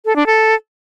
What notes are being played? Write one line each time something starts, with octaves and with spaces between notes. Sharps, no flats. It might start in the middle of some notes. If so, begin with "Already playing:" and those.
A4
D4
A4